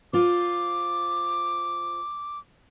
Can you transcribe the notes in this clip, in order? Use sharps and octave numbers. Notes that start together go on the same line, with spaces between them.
F4 C5 D6